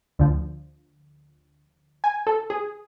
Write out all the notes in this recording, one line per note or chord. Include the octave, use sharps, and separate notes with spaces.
D2 D3 F3
G#5
A4
G#4